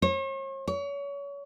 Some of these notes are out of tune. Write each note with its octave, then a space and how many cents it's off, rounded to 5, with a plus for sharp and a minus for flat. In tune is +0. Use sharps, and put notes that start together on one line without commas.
C#5 -45
C#5 +30